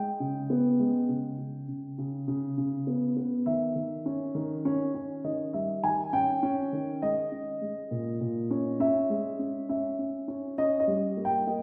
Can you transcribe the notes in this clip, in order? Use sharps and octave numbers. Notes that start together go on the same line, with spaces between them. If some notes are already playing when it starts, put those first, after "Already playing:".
Already playing: G#3 G5
C#3
B3
G#3
C#3
C#3
C#3
C#3
C#3
C#3
B3
B3
D#3 E5
D#3
C#4
D#3
C#4
C#4
D#3 D#5
G3 E5
D#3 G#5
C#4 G5
C#4
D#3
G#3 D#5
C#4
G#3
A#2
A#2
C#4
C#4 E5
G#3
C#4
C#4 E5
C#4
C#4
C#4 D#5
D#5
G3
A#3
G5
A#3 D#5